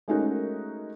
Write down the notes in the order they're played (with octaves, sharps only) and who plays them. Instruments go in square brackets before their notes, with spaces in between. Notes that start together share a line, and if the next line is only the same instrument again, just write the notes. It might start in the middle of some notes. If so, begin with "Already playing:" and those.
[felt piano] G#3 A3 C#4 D#4 F#4 A#4